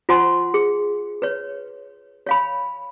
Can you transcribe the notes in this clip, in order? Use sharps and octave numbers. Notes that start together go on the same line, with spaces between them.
F4 C5 F#5 G#5 C6
G#4
B4 C#5
C#5 F5 B5